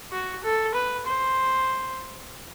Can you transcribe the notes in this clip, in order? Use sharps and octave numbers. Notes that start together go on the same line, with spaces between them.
F#4
A4
B4
C5